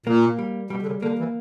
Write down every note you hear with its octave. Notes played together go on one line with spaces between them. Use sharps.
A#2 A#3
G3
B2 G3
D3
C#3
D3 A#3
E3